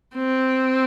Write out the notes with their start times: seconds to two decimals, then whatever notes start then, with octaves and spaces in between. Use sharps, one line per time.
0.16 C4